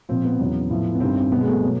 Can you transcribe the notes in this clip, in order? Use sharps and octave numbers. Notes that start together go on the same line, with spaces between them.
A#2 F3 C4
B3
E2 C#3 F#3
A2 F3
B3
G2 D#3 G3 C4
C4
B2 F#3 B3
G#3
A3
B2 F#3